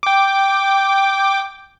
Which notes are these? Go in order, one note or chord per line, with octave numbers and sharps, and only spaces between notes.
G5 D6